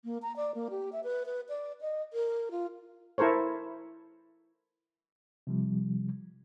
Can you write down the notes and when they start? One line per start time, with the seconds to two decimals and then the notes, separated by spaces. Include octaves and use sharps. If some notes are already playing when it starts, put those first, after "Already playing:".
0.04 A#3
0.22 A#5
0.36 D5
0.55 A#3
0.70 G4
0.92 E5
1.04 B4
1.26 B4
1.49 D5
1.81 D#5
2.13 A#4
2.51 F4
3.18 E4 A4 A#4 C5 C#5
5.47 C3 F3 G3